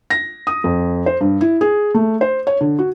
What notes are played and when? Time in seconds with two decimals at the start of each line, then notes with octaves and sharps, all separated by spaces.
0.10 A#6
0.47 D#6
0.64 F2
1.06 C5
1.21 G2
1.41 E4
1.61 G#4
1.94 A3
2.21 C5
2.47 C#5
2.61 D3
2.79 F#4